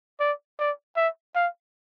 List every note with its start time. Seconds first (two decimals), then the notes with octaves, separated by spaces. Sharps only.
0.20 D5
0.59 D5
0.97 E5
1.36 F5